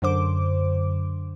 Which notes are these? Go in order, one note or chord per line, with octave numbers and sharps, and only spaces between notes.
F#2 D3 C5 D6